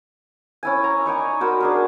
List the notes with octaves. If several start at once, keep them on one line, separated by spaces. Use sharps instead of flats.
C#4 E4 G#5
A#5
D#4 C#5 D5 G#5
F#4 A#4 C5 B5
D4 G#4 A#4